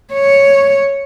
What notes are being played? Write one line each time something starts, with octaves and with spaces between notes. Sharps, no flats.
C#5